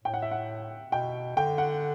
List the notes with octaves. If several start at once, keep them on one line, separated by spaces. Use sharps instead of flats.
A2 G5
F#5
E5
F#5
B2 G5
D3 G5
F#5